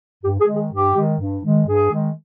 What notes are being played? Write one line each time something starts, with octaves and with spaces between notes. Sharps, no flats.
G2 G4
G#4
D#3 G#3
G#4
G2 G4
D#3 G#3
G2
D#3 G#3
G2 G#4
D#3 G#3